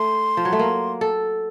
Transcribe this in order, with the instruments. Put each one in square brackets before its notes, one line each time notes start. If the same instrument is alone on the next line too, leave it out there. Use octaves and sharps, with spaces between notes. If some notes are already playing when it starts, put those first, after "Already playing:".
Already playing: [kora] A3 [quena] C6
[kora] F3
F#3
A3
A#3
A4